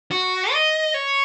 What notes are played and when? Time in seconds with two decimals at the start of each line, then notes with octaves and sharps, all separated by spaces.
0.11 F#4
0.52 D#5
0.94 C#5